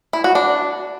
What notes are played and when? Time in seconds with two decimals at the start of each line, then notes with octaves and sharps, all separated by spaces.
0.13 E4
0.24 F#4
0.35 D4